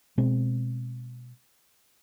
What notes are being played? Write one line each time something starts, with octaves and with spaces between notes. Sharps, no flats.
B2 G#3 C4